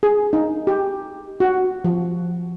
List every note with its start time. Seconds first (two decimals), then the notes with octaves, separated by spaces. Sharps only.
0.03 G#4
0.33 D#4
0.67 G4
1.40 F#4
1.84 F3